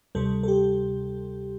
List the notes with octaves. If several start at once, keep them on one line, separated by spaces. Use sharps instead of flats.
D2 C3 G3 A4
A4
G4